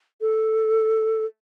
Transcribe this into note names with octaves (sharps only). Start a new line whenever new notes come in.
A4